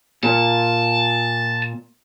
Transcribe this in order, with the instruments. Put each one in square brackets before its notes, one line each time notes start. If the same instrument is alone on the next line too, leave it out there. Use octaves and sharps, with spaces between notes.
[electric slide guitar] A#2 [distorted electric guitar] A5